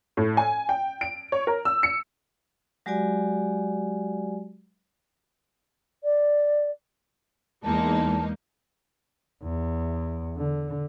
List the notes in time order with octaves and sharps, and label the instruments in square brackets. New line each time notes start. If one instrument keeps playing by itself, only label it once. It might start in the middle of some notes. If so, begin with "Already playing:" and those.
[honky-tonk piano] A2
G#5
G5
D7
C#5
A#4
E6
C#7
[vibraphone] F#3 G#3 F#4 G4 D5 G#5
[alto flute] D5
[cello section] E2 [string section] G#3 A#3 D#4 [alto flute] A5
[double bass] E2
D3